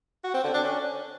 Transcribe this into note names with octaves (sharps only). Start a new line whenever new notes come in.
F#4
C4
D3
D4
C#4